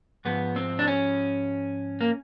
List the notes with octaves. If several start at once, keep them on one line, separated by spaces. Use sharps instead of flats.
G#2 F3 B3
C4
D4
C#4
A#3